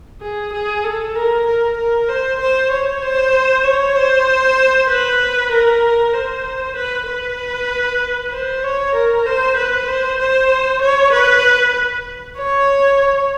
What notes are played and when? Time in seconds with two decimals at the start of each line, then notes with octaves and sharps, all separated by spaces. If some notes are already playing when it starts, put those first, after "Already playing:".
0.21 G#4
0.53 G#4
0.84 A4
1.15 A#4
1.47 A#4
1.77 A#4
2.09 C5
2.40 C5
2.71 C#5
3.02 C5
3.64 C#5
3.96 C5
4.89 B4
5.52 A#4
6.14 C5
6.76 B4
7.08 B4
8.32 C5
8.63 C#5
8.95 A#4
9.26 C5
9.57 B4
9.88 C5
10.19 C5
10.82 C#5
11.12 B4
12.38 C#5